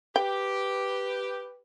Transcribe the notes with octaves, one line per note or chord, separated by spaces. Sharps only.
G4 B4 G5